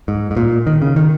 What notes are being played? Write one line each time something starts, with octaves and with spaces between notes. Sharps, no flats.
G#2
G#2
A#2
D#3
C#3
D#3